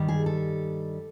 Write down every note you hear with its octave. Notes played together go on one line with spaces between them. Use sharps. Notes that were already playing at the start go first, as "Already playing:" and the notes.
Already playing: G2 D#3 G3
G#4
A4